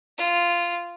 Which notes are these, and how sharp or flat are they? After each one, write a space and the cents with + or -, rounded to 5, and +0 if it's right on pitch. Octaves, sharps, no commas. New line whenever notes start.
F4 -10